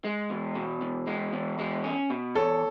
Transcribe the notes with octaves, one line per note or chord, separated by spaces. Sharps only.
G#3
E2
B2
E2
G#3
E2
G#3
C#4
B2
E2 A4 C#5